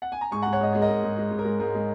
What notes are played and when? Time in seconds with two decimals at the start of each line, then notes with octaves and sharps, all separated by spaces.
0.02 F#5
0.12 G#5
0.21 A#5
0.31 G#2 G#5 C#6
0.42 F#5 A#5
0.46 G#2
0.53 C#5 F#5
0.61 G#2 D#5
0.73 G#3 C#5
0.81 A#4 D#5
0.89 G#2
1.03 G#2
1.18 G#3
1.31 G#2
1.39 A#4
1.45 G#3
1.59 G#2 A#4
1.75 G#3